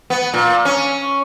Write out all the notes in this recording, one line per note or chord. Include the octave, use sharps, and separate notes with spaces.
B3
A#2
C#4